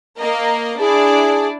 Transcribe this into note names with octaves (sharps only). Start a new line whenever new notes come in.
A#3 A#4 D#5
D4 E4 G#4 D5